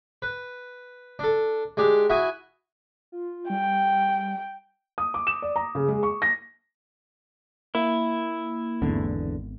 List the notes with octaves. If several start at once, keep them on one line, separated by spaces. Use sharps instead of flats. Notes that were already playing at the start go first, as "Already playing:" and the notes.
B4
D4 A4
G#3 D4 G4
E4 F#4 E5 F#5 G#5 D#6
F4
G3 G5
D#6
D6
E7
D5
A#5
C#3
G#3
C#6
A#6
A#3 E4
G#1 E2 D3 B3